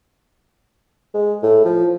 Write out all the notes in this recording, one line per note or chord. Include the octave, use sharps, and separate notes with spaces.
G#3
A2
F3